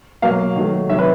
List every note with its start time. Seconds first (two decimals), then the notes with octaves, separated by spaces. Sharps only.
0.22 B2 F#3 A#3 F5
0.56 D#3 F#3 A3
0.89 C3 D#3 F#3 E5
0.99 B4